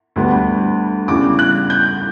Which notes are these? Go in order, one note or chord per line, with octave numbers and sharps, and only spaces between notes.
D2 D3 G3 B3
E2 C#3 G3 D6
F#6
G6